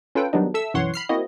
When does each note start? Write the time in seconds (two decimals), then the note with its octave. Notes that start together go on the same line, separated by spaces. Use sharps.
0.15 C#4 F4 A4 B4 G5
0.33 D#3 F#3 G3 B3 D4 D#4
0.54 A4 E5 E6
0.74 B1 F#2 E3 C#5 F#5 C6
0.94 B5 F6 C7
1.09 A#3 C4 E4 F#4 D#5